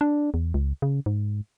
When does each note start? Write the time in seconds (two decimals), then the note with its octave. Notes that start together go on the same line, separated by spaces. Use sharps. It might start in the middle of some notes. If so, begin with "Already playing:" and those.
0.01 D4
0.34 E2
0.54 C#2
0.82 C#3
1.06 G#2